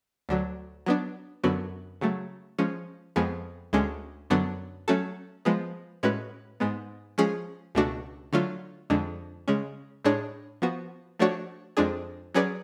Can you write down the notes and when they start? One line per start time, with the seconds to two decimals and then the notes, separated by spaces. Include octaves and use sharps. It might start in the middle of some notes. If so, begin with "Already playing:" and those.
0.29 D2 D3 F#3
0.86 F#3 B3 D4
1.44 F#2 D3 F#3 B3 F#4
2.01 C#3 F#3 A3
2.59 F3 G#3 C#4
3.16 F2 F3 G#3 B3
3.73 D2 D3 G#3 C#4
4.30 F#2 D3 F#3 B3 D4
4.88 F#3 A3 C#4 F#4 A4
5.45 F3 G#3 B3
6.03 A2 G#3 C#4 F#4 B4
6.60 G#2 G#3 B3
7.18 F3 G#3 C#4 G#4
7.75 C#2 B2 A3 D4 F#4
8.33 D3 F#3 A3 F4
8.90 F2 D3 G#3 D4
9.48 C#3 G#3 C#4
10.05 A2 G#3 D4 G#4 C#5
10.62 F3 B3 F#4
11.19 F3 A3 D4 F#4 C#5
11.77 F2 F3 G#3 D4 G#4
12.34 F#3 C#4 G#4 B4 D5